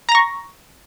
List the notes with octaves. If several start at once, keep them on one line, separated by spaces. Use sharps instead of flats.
A#5 C#6 A#6